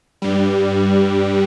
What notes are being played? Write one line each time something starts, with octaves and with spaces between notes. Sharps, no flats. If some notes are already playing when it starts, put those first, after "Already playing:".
G2 G3